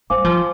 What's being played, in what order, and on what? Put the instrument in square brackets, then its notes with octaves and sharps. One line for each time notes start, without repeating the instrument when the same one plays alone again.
[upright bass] G3 [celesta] C5 F5 G#5 D6
[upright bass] F3